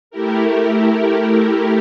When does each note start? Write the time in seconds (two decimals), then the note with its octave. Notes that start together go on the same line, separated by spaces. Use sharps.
0.11 A3 E4 G4 A#4